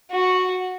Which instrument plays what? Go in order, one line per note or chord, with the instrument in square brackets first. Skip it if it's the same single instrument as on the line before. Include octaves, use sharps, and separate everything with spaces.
[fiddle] F#4